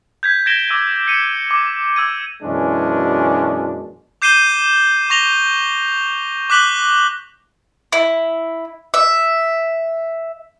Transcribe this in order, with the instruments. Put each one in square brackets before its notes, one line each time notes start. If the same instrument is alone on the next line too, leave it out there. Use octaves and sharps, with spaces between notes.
[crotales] G6 G#6 B6
G#6 A#6 B6 D7 E7 G7
D6 E6 A#6 D#7
B6 C#7 D#7 E7
D6
D6 E6 G#6 D#7
[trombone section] F#2 B2 E3 G#3 C#4 D4
[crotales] D6 G6 C7 D#7 E7 G7
C#6 A#6 F7 G7
D6 F#6 B6 F#7 G7
[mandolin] E4
E5